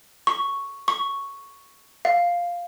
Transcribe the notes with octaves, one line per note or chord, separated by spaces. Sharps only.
C#6
C#6
F5